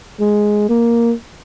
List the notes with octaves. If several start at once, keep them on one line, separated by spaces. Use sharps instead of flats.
G#3
A#3